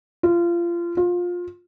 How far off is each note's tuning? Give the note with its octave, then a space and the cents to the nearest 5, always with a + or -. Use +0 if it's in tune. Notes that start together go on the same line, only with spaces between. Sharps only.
F4 -25
F4 +20